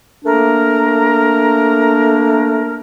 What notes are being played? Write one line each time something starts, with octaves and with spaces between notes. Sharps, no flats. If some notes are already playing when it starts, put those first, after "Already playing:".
A3 A#3 D4 A#4